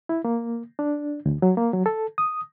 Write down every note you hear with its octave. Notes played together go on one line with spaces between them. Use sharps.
E4
A#3
D4
D2
F#3
A#3
F#3
A4
D#6